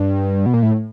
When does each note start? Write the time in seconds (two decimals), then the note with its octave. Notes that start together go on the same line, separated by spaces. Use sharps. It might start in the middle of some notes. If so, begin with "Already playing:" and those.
Already playing: G2
0.46 B2
0.54 A#2
0.63 A2